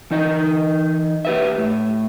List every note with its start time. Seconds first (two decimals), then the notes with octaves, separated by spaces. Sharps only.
0.11 E3 D#4 D#5
1.25 G4 B4 E5
1.58 A2